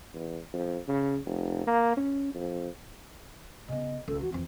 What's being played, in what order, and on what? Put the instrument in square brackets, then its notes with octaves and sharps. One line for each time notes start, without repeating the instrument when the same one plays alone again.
[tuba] E2
F2
C#3
F1
A#3
C#4
F2
[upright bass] C#3 B3 [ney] D#5
[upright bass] C#2 [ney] A4
[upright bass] E3 [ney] F#4
[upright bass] F2 E3 [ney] C4